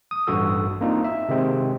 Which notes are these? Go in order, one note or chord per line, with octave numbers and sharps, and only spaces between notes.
D#6
A1 G2 F#4 A4 E6
A#3 C4 D4 D#4 F4
E5
C3 D#3 G#3 C4